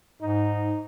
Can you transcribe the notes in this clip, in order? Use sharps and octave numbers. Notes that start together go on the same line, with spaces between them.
G#2 D#4